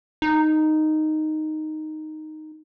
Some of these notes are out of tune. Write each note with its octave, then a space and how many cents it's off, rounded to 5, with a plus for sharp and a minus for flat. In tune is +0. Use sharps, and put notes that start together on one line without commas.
D#4 -5